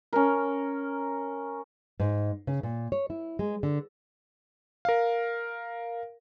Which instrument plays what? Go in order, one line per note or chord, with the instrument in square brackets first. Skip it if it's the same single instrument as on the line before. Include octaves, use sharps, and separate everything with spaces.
[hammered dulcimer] C#4 A#4
[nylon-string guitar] G#2
C#3
A#2
C#5
E4
G#3
D3
[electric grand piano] A#4 F5